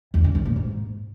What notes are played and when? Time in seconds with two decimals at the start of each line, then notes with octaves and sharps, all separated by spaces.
0.14 E2
0.24 D3
0.35 D#3
0.45 A#2
0.56 G#2